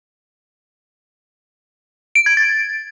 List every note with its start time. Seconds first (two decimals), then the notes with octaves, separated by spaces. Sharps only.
2.15 D7
2.26 G#6
2.37 A6